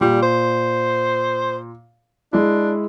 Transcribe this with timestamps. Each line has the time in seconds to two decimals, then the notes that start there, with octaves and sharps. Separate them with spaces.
0.01 A#2 G3
0.22 C5
2.33 G#3 D4 E4